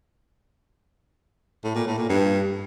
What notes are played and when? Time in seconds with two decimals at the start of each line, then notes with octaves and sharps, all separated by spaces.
1.64 A2
1.76 A#2
1.87 A2
1.98 A#2
2.09 G2